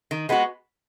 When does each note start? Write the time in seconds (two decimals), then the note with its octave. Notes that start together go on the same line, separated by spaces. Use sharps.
0.11 D#3
0.29 G#3 B3 F#4